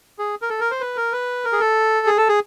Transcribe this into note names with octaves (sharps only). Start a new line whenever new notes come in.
G#4
A#4
A4
A#4
C5
B4
A#4
B4
A#4
G#4
A4
G#4
A4
G#4